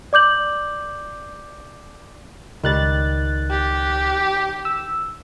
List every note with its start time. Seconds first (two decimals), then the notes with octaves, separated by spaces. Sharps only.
0.13 D5 D6 G6 F#7
2.63 C#2 D#3 G3 F#6 A6
3.50 G4
4.65 E6